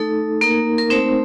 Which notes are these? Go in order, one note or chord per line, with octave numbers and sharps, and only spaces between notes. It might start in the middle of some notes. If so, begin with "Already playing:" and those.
Already playing: A3 D#4 A4
A#3 D#4 A#4
A#4
A3 C4 D#4 C5